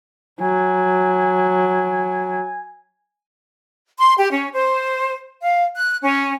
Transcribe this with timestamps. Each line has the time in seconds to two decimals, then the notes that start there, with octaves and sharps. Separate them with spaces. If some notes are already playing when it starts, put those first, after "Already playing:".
0.41 F#3 G#5
3.97 C6
4.18 G4
4.31 C#4
4.54 C5
5.42 F5
5.75 F#6
6.02 C#4